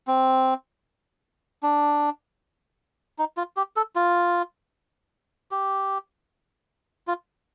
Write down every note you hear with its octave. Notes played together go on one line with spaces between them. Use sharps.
C4
D4
D#4
F4
G4
A4
F4
G4
F4